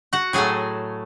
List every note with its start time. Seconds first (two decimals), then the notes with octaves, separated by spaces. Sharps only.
0.13 F#4 F#5
0.33 A2 F#3 A3 G#4 G#5